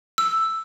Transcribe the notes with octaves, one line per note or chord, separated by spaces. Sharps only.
E6